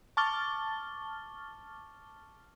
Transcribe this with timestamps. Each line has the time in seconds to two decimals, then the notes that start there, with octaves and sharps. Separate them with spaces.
0.17 A5 C#6 D6 F6 A6 G7